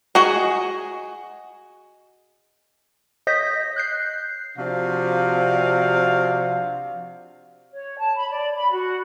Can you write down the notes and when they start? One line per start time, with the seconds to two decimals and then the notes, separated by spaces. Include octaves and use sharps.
0.15 F#4 G#4 D#5
3.27 C#5 D#5 D#6 G6 A#6 B6
3.76 F#6 G6 C7
4.57 C3 F3 D4 F#4 F5
7.72 C#5
7.98 A5
8.16 B5
8.31 D5
8.54 B5
8.71 F#4